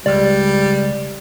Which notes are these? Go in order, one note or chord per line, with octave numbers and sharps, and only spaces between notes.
C#2 G3 D5